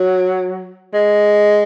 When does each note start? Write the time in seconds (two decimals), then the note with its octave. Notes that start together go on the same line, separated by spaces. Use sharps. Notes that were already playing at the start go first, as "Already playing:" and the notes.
Already playing: F#3
0.93 G#3